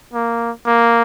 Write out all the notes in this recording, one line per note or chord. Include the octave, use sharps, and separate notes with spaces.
A#3
A#3